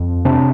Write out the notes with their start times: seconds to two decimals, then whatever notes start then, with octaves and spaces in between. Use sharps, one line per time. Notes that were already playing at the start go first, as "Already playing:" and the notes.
Already playing: F2
0.25 C3 D4